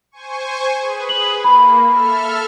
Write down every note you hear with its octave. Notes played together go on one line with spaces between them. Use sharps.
C5 G#5 C#6
G#4 B4
F#7
A#3 B5
A4 E5 F6